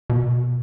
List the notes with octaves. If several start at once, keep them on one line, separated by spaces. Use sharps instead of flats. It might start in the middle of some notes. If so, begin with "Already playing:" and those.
B2